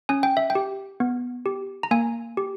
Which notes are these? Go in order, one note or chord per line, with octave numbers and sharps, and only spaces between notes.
C#4 G#5
G5
E5
G5
G4
B3
G4
A#5
A#3 G#5
G4